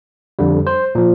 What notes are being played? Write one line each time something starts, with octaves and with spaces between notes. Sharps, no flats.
F2 D3 G3
C5
A#2 F3